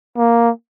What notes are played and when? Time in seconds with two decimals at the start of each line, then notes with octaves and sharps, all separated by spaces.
0.17 A#3